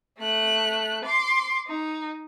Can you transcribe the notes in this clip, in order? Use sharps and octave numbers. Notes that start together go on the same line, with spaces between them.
A3 F#6
C6 D6
D#4